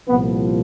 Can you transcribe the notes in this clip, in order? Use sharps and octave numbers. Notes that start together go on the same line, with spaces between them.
C2 A#2 F3 B3